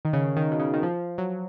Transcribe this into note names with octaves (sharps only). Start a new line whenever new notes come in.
D#3
C#3
D#3
B2
C#3
D#3
F3
F#3